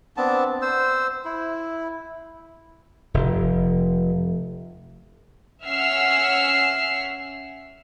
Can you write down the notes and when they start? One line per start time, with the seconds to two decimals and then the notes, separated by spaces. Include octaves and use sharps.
0.17 B3 C4 D4 A5
0.62 C5 E6
1.25 E4
3.14 F1
5.66 C#4 E5 F#5 E6 F6 C7